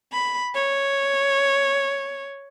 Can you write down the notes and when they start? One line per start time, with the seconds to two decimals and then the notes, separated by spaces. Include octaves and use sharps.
0.13 B5
0.55 C#5